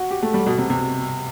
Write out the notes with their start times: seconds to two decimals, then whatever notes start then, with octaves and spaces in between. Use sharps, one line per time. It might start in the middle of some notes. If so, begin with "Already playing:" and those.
Already playing: F#4
0.11 G4
0.23 A3
0.34 G3
0.46 B2
0.58 C3
0.70 C3